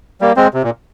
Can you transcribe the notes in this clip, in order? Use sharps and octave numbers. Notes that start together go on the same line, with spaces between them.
G3 A#3
G#3 C4
C3
A#2